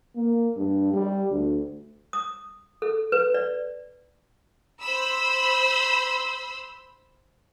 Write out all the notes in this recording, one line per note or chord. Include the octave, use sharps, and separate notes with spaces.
A#3
G2
G3
D2
D#6
A4
B4
D5
C5 B5 E6